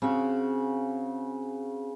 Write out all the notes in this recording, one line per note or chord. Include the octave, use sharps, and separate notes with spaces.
C#3 C4 F#4